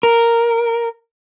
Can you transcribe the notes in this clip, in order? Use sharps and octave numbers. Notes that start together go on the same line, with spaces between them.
A#4